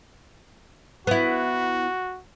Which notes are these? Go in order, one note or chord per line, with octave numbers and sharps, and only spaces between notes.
B3 E4 F#4